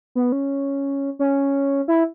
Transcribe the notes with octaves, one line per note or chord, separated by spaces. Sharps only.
B3
C#4
C#4
E4